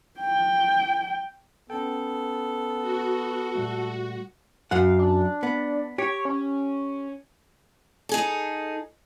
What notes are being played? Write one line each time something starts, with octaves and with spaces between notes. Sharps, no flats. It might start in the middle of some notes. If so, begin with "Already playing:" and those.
G5
B3 C#4 A4 G5
F#4
A#2 G3 A3
F#2 F5 F#5
D4
B3
G4 C#5
C#4
D#4 G#4 A4